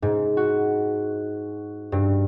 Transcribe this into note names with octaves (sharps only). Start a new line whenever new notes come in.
G#2
F#4
G2